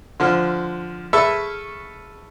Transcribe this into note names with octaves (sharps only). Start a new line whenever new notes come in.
D3 F3 C6 F6
G#4 A4 B4 E5 C#6 F6